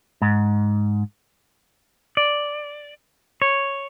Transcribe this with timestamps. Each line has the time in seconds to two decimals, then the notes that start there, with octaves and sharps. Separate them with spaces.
0.22 G#2
2.17 D5
3.42 C#5